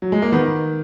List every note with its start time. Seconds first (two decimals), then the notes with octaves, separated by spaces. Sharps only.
0.02 F#3
0.12 G#3
0.22 A#3
0.32 D#3 B3